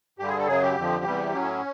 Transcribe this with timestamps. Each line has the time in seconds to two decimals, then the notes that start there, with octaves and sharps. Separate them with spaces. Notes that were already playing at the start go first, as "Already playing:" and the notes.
0.19 G2 D3 G3 G4
0.28 G#4
0.38 A4
0.47 F#2 C#3 F#3 G#4
0.62 G4
0.75 F2 D3 F3
1.05 E2 C3 E3 G3
1.33 A2 F#3 C#4